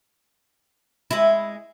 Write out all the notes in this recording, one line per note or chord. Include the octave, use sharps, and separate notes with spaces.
G#3 E4